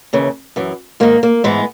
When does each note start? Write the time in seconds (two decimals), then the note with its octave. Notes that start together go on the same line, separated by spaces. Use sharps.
0.13 D#2 C#3 E3
0.56 F#2 E3
1.00 G#2 D#3 A#3
1.23 A#3
1.44 G#2 E3 G#3 B3